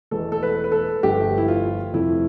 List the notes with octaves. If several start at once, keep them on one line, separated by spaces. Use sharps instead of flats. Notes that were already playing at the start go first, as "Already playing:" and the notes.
E1 E2 B2 A3 A4
A4
B4
B4
A4
G1 G2 F3 A3 G4
E4
F4
F2 C3 F3 A3 E4